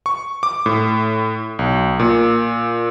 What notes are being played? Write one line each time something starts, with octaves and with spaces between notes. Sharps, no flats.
C#6
D6
A2
B1
A#2